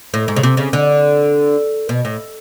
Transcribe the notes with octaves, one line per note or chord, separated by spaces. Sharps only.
A2
G#2
C#3
C3
C#3
D3
B2
A2